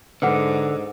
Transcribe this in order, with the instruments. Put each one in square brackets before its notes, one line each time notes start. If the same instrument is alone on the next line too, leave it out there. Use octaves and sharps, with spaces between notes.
[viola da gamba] G#2 [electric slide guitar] D3 [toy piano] B4 C5 F#5